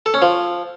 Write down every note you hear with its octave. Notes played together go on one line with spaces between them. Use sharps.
A4
C#4
F3